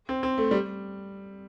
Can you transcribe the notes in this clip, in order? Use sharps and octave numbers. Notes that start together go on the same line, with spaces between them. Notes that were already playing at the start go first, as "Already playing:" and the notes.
C4
C4
A3
G3